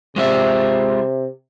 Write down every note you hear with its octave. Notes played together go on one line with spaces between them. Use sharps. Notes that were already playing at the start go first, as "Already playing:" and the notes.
C3 G#3 F4 E5